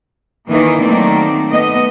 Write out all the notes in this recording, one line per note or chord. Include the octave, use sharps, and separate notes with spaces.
D#3 E3 A#3
D#3 F#3 A3 A#3 C4 D5
A3 B3 D#5